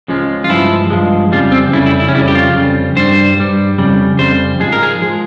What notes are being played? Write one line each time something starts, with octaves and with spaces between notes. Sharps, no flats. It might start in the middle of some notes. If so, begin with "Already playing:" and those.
C#2 C#3 F3 G#3
F4
G2 F3 G#3 E4
G2 F3 G#3
F2 C#3 G3 F4
C4
F2 C#3 G3 E4
E4
E4
C#4
F2 C#3 G3 E4
G4
F4
F2 C#3 G3
G2 G3 C5
G2 G3
F2 C#3 G3
F2 C#3 G3 C5
G#2 F3 G#3 G#4
A#4
G#4
F3 G#3